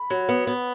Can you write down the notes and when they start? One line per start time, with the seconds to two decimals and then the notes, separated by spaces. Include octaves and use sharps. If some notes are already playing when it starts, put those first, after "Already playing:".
Already playing: B5
0.10 F#3
0.29 B3
0.47 B3